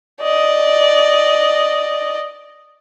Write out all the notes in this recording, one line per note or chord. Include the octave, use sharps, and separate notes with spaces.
D5 D#5